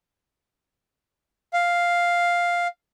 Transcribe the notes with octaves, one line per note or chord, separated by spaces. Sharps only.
F5